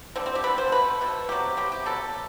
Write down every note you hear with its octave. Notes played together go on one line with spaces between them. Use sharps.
D3 G3 B3 C4
C4
G4
D3 G3 B3 B4
C5
B2 A3 B4
B2 A3
C3 F#3 B3 G4
C3 F#3 B3 G4
G4
B2 F#3 B3 A4